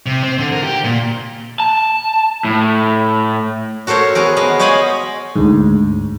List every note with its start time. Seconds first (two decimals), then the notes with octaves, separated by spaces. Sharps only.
0.06 C3
0.23 C4
0.39 D3
0.53 A#4
0.64 G4
0.84 A#2
1.60 A5
2.45 A2
3.87 F#4 A4 A#4 C5 C#5
4.15 B3 F#4 G#4 A#4
4.37 B3 D#5
4.59 C5 C#5 D#5 F5 G#5 B5
5.36 D2 G#2